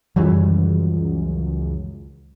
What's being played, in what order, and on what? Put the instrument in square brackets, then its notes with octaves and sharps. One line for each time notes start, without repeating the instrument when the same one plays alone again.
[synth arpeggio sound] C#2 F#2 [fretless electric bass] D#3 E3 G3